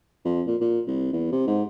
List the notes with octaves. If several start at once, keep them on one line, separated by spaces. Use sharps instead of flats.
F2
A#2
A#2
C2
E2
C3
G#2